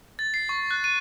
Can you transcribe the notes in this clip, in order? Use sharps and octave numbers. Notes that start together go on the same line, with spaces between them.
A6
C7
C#6
F#6
D#7